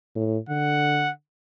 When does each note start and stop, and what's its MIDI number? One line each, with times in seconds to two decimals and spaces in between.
0.15 0.37 45
0.49 1.11 50
0.49 1.11 78